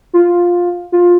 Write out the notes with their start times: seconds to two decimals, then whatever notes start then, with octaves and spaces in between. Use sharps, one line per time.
0.13 F4
0.92 F4